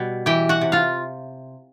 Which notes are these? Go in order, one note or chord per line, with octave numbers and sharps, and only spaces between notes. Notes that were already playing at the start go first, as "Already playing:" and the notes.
Already playing: B2 G3
E3 G4 G5
F#4 F#5
C3
F4 F5